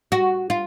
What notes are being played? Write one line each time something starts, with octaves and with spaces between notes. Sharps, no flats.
F#4
F4